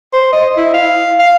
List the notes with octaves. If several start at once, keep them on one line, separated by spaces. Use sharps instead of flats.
C5
D#5
E4
F5
F5